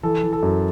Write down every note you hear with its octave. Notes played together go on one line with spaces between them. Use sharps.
E3 A4
E3
A4
F#2